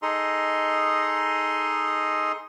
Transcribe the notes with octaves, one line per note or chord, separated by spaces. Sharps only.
D#4 G#4 A4 D#5 A#5 C6